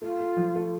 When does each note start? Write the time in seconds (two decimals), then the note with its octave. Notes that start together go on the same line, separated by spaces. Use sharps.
0.02 A3 F4
0.19 A3
0.37 F3
0.55 A3